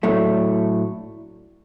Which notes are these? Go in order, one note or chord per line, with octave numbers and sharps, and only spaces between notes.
A2 F#3 A3 D4